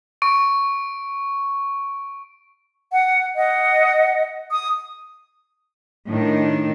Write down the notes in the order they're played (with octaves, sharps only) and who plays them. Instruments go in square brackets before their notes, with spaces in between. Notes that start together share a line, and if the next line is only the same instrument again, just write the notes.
[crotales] C#6 D7
[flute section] F#5
D#5 F#5
D#6
[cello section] A2 D#3 D4